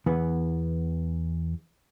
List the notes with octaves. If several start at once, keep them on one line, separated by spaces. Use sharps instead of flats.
E2 E3 B3